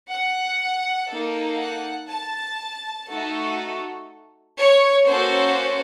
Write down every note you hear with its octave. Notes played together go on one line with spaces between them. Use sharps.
F#5
A#3 D#4 A4
F#5
A5
A3 D#4 F#4 A4
C#5
A#3 C#4 F#4 A4 C5